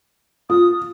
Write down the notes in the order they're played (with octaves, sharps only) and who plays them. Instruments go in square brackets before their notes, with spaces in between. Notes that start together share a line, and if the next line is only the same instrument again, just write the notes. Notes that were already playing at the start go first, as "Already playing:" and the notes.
[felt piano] F4 [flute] D#6